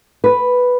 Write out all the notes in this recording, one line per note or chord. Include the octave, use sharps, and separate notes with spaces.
B4